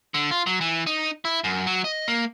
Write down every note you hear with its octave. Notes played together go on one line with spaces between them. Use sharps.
D3
F4
F#3
E3
D#4
E4
F#2
F#3
D#5
A#3